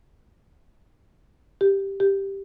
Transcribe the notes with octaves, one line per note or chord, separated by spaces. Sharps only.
G4
G4